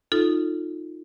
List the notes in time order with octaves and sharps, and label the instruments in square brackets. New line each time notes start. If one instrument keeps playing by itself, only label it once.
[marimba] D#4 F4 A4